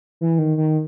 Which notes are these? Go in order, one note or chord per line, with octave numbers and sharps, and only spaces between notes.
E3
D#3
D#3